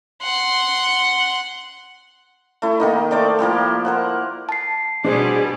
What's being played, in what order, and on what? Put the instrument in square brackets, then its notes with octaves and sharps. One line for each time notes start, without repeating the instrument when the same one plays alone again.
[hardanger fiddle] F#5 C6
[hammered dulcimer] A3 E4
D#3 A#3 D#4
A3 C5 D5 D6
F3 A#3 E4 G4
A#4 C5 F#5
[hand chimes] A5 C7
[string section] B2 G3 [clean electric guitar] D4 C5 [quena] G#4